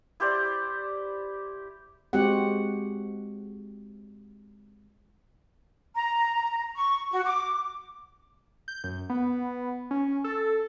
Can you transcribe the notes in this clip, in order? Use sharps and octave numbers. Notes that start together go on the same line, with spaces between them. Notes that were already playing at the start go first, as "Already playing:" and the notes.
E4 G4 C5 D5
G#3 C4 F#4 G4 F#5
A#5
C#6
F#4
D6
G6
F#2
B3
C#4
A4